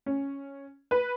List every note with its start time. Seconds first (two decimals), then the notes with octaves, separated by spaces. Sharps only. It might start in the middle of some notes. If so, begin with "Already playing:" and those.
0.06 C#4
0.91 B4